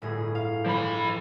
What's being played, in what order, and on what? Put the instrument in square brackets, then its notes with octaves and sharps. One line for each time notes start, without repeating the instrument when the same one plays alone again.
[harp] G1 A2 G#4
F5
[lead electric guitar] F3 B5